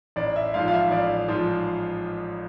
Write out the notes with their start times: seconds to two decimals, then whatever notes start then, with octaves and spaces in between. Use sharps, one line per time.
0.16 A1 D5
0.36 E5
0.54 G#2 F3 F5
0.68 F5
0.73 E5
0.91 A1 D5
1.28 G#2 F3